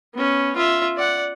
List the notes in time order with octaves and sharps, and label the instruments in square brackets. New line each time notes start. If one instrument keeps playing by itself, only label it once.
[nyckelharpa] B3 C#4
F4 E5
D5 F#5